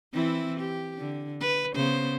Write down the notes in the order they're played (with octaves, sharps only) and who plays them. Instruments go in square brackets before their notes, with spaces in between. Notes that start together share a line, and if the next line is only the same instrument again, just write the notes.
[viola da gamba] E3 C4 E4
G4
D3
B4
C#3 B3 C5